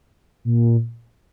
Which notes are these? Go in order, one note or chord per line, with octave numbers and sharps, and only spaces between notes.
A#2